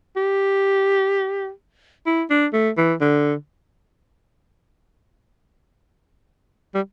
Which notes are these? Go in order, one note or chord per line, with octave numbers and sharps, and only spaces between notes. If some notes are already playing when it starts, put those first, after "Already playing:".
G4
E4
D4
A3
E3
D3
G3